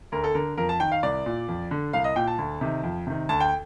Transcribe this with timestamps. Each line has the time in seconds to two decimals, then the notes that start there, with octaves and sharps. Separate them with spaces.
0.12 D2 A#4
0.24 A4
0.35 D3 A#4
0.57 F2 A#4
0.69 A5
0.80 D#3 G5
0.92 F5
1.03 C2 D5
1.26 A#2
1.48 F2
1.71 D3
1.93 C2 F5
2.04 D#5
2.16 A#2 G5
2.27 A5
2.38 D2
2.61 C3 D#3
2.83 F2
3.07 C3 D#3
3.29 D2 A5
3.40 G5